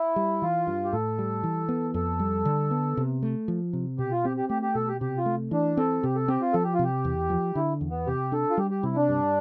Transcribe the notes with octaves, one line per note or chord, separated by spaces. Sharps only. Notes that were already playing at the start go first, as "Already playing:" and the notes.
Already playing: E4
G3
E3 F4
G2
G4
A2 A4
G3
E3
B3
F2 A4
G3
D3
B3
C3
A3
F3
C3
B2 G4
F4
C4 G4
G4
A3 G4
G4
B2 A4
G4
C3 G4
F4
A3
E3 D4
C4 A4
C3 G4
A4
C4 G4
F4
F3 A4
G4
F4
C3 G4
E2
F3
D3 E4
E2
B3
C3 G4
D4 A4
F4
G3 G4
G4
C3 E4
D4
G2